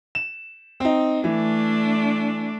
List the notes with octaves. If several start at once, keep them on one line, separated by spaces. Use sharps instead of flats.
E7
C4 D#4
E3 A3 D4